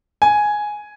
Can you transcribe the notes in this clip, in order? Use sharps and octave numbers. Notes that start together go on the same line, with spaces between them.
G#5